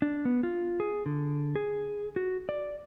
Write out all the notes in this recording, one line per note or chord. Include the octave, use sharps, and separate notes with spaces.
D4
B3
F4
G#4
D3
G#4
F#4
D5